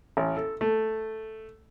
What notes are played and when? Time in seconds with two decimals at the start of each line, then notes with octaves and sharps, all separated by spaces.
0.17 A1
0.37 A4
0.61 A3